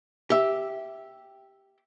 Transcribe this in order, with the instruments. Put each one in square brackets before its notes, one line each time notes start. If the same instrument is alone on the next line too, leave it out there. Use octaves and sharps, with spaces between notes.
[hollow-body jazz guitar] G4 E5